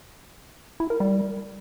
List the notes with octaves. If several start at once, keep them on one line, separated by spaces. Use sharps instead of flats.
E4
A#4
G3